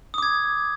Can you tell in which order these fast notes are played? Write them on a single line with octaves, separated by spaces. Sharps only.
D#6 D6 G#6